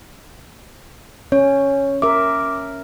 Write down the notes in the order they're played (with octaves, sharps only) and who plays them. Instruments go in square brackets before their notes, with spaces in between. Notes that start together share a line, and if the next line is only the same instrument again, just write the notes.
[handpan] C#4 [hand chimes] C#5
[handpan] A#4 E5 [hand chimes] D6